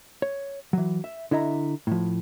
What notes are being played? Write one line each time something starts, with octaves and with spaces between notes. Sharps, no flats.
C#5
E3 F#3
E5
D3 E4 D#5 E5 A#5
A2 F3